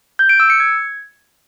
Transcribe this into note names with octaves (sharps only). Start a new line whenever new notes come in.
G6
D7
E6
C#7
G#6